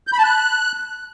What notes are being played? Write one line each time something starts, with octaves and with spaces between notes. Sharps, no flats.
G6
B5
A5
F#6